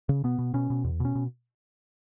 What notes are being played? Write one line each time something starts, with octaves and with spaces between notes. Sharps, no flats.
C#3
B2 B3
B2
B2 C#4
B2
E2
B2 C#4
B2